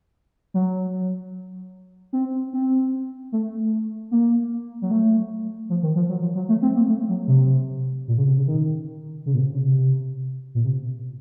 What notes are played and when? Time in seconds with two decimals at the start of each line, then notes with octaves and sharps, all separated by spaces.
0.54 F#3
2.13 C4
2.53 C4
3.32 A3
4.11 A#3
4.82 F#3
4.91 A3
5.70 F3
5.83 D#3
5.96 F3
6.09 F#3
6.22 F3
6.35 F#3
6.49 A3
6.62 C4
6.76 A#3
6.88 A3
7.09 F#3
7.28 C3
8.08 A#2
8.18 C#3
8.27 C3
8.37 C#3
8.47 D#3
9.26 C#3
9.34 A#2
9.39 C3
9.53 C#3
9.65 C3
10.55 A#2
10.64 C3